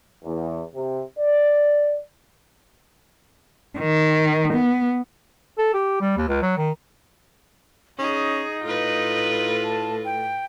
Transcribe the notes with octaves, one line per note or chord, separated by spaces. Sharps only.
E2
C3
D5
D#3
B3
A4
G4
G3
D#2
C#2
F#3
D#3
C#4 D#4 G#4
A2 F4 B4
A5
G5